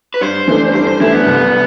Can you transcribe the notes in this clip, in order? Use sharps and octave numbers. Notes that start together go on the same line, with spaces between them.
B4
G2 C5
E3 A3 D4
G2 C5
C5
E3 A3 D4 E4
B3
C2